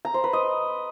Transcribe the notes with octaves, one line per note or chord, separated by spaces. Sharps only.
A#5
C5
B4
D#5